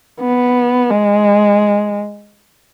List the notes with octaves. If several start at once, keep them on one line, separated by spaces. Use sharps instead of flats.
B3
G#3